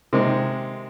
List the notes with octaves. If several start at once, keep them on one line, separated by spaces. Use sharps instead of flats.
C3 D#3 G#3